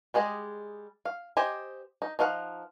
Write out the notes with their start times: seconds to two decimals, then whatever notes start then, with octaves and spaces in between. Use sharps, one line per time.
0.14 G3 G#3 G#4 D#5
1.05 F5
1.37 G4 C5 D#5 G#5
2.02 D#4
2.19 F3 D#4 F5 F#5